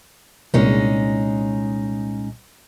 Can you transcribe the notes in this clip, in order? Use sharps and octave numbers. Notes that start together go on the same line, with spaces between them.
C2 A#2 G#3 C#4 D#4